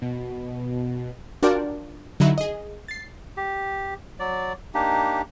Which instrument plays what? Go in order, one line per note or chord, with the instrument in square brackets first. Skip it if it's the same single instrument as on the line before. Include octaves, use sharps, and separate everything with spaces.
[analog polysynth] B2
[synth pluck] D4 F4 F#4 A#4 D5 G5
D3 F#3 D#4 E4 F#4
G#4 D#5
A6 C7
[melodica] G4
F#3 D5
A#3 D4 D#4 G4